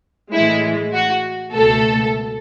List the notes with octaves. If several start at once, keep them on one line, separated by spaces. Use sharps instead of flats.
A2 E3 G#3 E4
F#4
C#2 B2 A3 A4